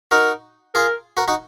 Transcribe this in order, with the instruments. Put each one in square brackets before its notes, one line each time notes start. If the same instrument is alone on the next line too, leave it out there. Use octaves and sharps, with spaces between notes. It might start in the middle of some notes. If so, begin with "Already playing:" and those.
[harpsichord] D#4 F#4 [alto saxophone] A#4
[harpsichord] F4 G#4 [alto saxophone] A#4
[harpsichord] F#4 A#4
D#4 F#4